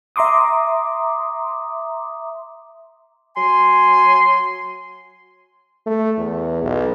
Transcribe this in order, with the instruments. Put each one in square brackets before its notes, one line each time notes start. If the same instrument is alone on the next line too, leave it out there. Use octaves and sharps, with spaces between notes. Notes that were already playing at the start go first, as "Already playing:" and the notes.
[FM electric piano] E5 A#5 C6 D6 D#6
[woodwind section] F#3 G#5 C6
[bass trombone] A3
E2
B1